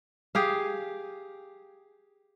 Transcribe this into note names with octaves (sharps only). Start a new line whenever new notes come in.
G4 G#4 F5